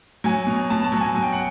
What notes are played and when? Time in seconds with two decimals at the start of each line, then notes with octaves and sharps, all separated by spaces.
0.24 F#3 G#5
0.47 B2
0.70 B2 A5
0.84 A5
0.92 F#3
1.00 G#5
1.15 F#3 G#5
1.23 G5
1.32 F#5